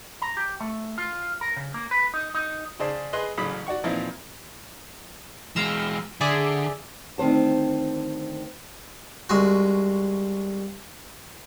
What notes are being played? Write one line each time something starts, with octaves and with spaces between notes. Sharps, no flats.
A#5
G4
A3
F4
A#4
C#3
A#3
B4
D#4
D#4
C#3 G#4 C5 D5 A5
G#4 B4 D#5 C6 F#6
A1 C#3 F#3 B5 D#6
F#4 D5 F#5 C#6
A#2 E3 F3 C4 D#4 E4
E3 G#3 F5 A#5 E6
D3 G#4 D5 E5
D2 D#3 C4 C5 A5
C2 G#3 F#4